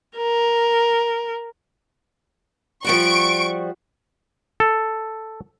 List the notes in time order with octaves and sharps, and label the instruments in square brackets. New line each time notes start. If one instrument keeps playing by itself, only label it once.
[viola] A#4
[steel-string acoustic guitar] F3 G3 F#4 [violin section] C#6 D7
[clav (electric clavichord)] A4